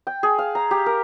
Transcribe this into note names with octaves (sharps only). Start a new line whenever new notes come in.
G5
G#4
F5
A#5
G4
A#4